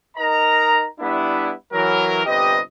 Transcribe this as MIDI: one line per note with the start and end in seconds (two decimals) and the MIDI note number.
0.17 0.84 63
0.17 0.84 70
0.17 0.84 75
0.17 0.84 82
1.00 1.52 55
1.00 1.52 59
1.00 1.52 62
1.00 1.52 64
1.73 2.21 52
1.73 2.21 54
1.73 2.21 70
2.26 2.59 31
2.26 2.59 48
2.26 2.59 67
2.26 2.59 71
2.26 2.59 75